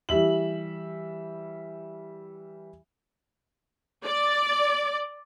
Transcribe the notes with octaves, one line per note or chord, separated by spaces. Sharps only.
E3 G3 E5 F#7
D5